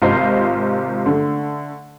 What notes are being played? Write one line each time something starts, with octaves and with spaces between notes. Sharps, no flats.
G#1 C3 F4 C5 D#5 C7
D3 A3